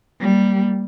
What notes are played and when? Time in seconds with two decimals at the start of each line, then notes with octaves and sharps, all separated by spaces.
0.21 G3 A#3